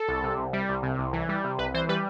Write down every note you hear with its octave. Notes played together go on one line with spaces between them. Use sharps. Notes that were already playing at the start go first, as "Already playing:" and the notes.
Already playing: A4
C2
C3
C2
G3
C2
C3
C2
E3
G3
C3
C2 B4
E3 C5
G3 B4